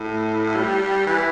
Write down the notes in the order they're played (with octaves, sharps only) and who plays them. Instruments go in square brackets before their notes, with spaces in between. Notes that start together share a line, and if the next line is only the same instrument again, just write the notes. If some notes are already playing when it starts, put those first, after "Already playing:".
Already playing: [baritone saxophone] A2
G3
E3